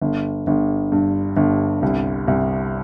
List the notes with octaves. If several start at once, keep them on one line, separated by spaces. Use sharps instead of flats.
G1
G1
G2
G1
C2
C2